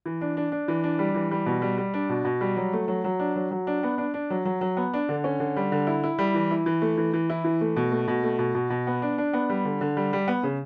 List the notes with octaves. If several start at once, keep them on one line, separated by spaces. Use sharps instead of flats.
E3
D4
D4
D4
E3
D4
G3
E3
G3
B2
G3
G3
D4
B2
B2
G3
F#3
A3
F#3
F#3
D4
F#3
F#3
D4
B3
D4
D4
F#3
F#3
F#3
B3
D4
D3
C#4
D3
G3
D3
E4
E4
G3
E3
E4
E3
A3
E3
E3
E4
E3
A3
B2
A3
B2
A3
B2
B2
B2
B3
D4
D4
B3
G3
D3
D3
G3
G3
B3
C#3